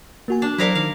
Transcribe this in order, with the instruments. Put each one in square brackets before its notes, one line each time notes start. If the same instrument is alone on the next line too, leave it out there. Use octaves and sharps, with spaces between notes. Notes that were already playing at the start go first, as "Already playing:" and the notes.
[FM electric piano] A#3 F#4 G#5
[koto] D4
[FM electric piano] F#3 C5 D5 [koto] E4 A#4 F5
[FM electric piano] D#3 [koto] F5